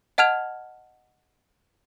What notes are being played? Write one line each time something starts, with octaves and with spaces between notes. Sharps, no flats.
D#5 F#5 A5 F6 G#6 F7